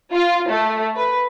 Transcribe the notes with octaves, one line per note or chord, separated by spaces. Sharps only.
F4
A3
B4